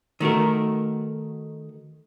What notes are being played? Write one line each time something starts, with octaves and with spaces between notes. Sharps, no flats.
D#3 A3 F#4 A#4